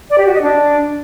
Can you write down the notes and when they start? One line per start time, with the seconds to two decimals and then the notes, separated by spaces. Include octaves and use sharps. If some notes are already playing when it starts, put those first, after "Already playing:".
0.10 D5
0.18 G4
0.26 F#4
0.34 D#5
0.42 D4